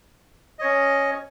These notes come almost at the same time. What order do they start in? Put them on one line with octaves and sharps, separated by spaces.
D#5 C#5 C#4